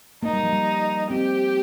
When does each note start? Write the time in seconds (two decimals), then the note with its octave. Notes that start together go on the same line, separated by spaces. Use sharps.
0.23 A#3 D#4
0.33 G3
0.43 F3
0.53 G3
1.10 C4 G4